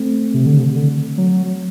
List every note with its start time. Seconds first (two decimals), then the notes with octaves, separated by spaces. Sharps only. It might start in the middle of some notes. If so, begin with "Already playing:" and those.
Already playing: A3 C4
0.34 C3
0.46 D3
0.59 C3
0.76 D3
1.18 F#3